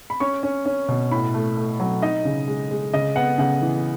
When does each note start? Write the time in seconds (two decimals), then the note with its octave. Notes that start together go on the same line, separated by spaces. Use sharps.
0.10 B5
0.20 C#4 C#6
0.43 C#4
0.66 C#4
0.88 B2
1.11 A2 B5
1.34 A3
1.57 A3
1.80 F#3
2.02 D#4 D#5
2.25 C#3
2.48 G#3
2.71 G#3
2.93 C#3 D#5
3.16 B3 F#5
3.38 C#3 F#5
3.62 E3